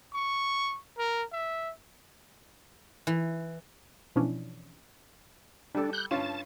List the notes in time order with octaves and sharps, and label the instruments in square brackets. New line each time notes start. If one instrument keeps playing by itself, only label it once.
[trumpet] C#6
A#4
E5
[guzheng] E3
[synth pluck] B2 E3 F3 C#4 D4
[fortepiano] G3 A4 [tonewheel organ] D4
[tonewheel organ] F#6 G6
[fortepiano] G2 C#4 F4 [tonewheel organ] A5